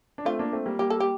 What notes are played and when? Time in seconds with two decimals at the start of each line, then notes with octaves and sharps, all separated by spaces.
0.18 D4
0.25 A3 C4 F4
0.39 A#3 D4
0.52 A3 C4
0.66 G3 A#3
0.79 G3 A#3 G4
0.90 A4
1.00 G4